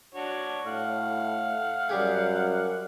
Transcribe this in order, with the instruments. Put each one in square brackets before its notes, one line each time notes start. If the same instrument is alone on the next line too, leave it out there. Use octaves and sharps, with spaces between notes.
[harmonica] D4 F#4 C#5
[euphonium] A2 [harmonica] F5 F#5
[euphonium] F#2 [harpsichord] G3 G4 G#4